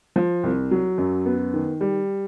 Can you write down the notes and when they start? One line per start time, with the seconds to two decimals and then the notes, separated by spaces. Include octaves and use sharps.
0.16 F3
0.43 C2
0.71 F#3
0.98 F#2
1.25 B3
1.53 D#3
1.81 G3